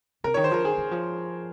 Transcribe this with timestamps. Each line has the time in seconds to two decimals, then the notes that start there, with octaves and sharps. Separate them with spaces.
0.24 C3 A#4
0.34 D#3 C#5
0.44 C5
0.51 F3 A#4
0.64 D#3 G#4
0.77 D#3
0.91 F3